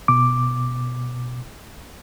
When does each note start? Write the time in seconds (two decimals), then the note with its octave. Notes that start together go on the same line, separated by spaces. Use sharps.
0.08 B2 D6